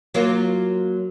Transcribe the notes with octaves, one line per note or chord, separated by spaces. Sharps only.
F#3 A#3 F4